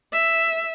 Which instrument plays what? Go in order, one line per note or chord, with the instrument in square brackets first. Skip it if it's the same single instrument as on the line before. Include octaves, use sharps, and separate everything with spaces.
[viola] E5